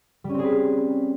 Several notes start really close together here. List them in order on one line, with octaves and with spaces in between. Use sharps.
G3 C#4 C4 G#4 B4